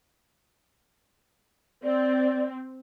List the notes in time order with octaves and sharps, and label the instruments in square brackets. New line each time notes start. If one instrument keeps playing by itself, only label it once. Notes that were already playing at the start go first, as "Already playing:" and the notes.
[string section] C4 [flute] D5